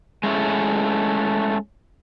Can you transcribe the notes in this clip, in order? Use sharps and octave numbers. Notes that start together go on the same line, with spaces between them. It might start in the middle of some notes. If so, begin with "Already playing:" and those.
G#3 A3 C#4 E4